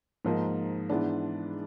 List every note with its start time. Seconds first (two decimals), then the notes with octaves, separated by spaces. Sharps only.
0.25 G#2 F3 A#3 D#4
0.90 G#2 E3 G#3 B3 D4